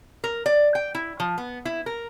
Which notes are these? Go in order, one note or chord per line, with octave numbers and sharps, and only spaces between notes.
A#4
D5
G5
E4
F3
B3
E4
A#4